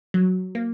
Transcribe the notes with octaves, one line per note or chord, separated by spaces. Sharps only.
F#3
A#3